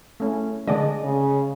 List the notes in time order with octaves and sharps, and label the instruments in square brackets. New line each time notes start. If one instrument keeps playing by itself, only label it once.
[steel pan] A3 C#4
[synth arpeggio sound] D3 D5 D#5 [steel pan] G#3 D4
[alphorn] C#3